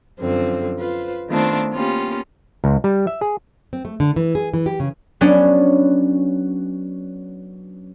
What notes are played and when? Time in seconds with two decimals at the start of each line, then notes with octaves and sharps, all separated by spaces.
0.19 F#2 D3 F3 C4
0.79 F4 B4 C5
1.29 D#3 A3 B3 C4 D4 F4
1.71 A#3 B3 C#4 F4 G4
2.64 C#2
2.84 G3
3.07 E5
3.21 G#4
3.73 C4
3.85 A3
4.00 D3
4.16 E3
4.35 G#4
4.54 E3
4.66 G4
4.80 C#3
5.21 F#3 B3 C#4 D4